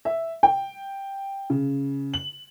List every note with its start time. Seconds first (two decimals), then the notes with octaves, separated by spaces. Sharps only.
0.05 E5
0.43 G5
1.50 C#3
2.14 F#7